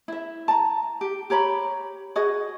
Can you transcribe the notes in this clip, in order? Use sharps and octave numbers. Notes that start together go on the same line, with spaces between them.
E4 E5
A5 A#5
G4
G4 C#5 A#5 B5
F#4 G#4 D#5